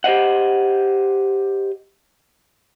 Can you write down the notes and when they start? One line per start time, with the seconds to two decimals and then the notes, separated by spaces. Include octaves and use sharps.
0.04 G4 C5 D#5 F#5